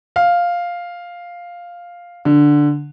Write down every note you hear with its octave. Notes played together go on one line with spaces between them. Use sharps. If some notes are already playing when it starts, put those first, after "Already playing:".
F5
D3